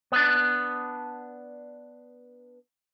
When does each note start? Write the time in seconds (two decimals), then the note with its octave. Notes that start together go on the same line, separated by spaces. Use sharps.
0.12 B3 D4